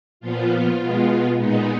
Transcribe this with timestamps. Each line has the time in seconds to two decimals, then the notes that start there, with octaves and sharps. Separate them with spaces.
0.20 A#2 F3 B3 F4
0.79 B2 G#3 B3
1.38 A#2 G#3 B3 D#4